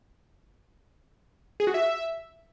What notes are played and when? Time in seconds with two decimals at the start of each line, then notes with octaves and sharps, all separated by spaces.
1.60 G#4
1.67 F#4
1.74 E5